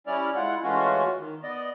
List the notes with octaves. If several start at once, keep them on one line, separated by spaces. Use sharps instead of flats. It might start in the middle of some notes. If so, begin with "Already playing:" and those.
G3 C#4 E4 D5 F6
G#3 E4 F4 F#5
E3 G#3 A3 C#4 F4 F#4
D#3
B3 D5 D#5